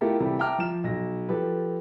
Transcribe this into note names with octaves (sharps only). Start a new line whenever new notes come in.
A3 E4 F4 G4 A4 A#4
C3 E3 G3
E5 G5 A5 A#5 D6 F6
F3 E7
B1 A#6
F3 G4 A4 B4